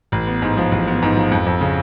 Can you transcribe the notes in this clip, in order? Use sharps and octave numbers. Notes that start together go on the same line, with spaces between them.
A1
B3
G#2
F3
A1
B3
G#2
F3
F2
F2
C#3